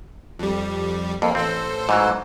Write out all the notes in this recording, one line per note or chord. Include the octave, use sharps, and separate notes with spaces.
F2 G3
F2 A#3
A1 C4 A4 C5
G#2 E3 F#3